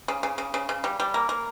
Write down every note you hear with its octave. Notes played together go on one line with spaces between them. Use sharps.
C#3
C#3
C#3
C#3
C#3
G3
G3
A#3
A#3